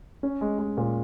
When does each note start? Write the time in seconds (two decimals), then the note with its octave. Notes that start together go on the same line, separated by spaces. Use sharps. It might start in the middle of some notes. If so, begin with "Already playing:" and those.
0.23 C#4
0.41 G#3
0.59 G#3
0.77 A#2